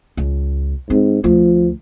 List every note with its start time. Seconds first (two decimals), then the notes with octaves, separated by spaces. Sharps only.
0.17 C#2
0.90 G#2 C4
1.24 D2 F3